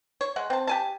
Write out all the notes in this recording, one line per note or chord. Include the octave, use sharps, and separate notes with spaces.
C#5
G#3 F#5
C4 A5
G4 G#5 A5